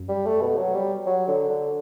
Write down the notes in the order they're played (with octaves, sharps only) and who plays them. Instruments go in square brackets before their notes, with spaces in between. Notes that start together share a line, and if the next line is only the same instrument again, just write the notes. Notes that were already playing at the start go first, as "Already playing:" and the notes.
Already playing: [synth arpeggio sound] F#2
[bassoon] G3
A3
B2
F#3
G3
F#3
D3
D3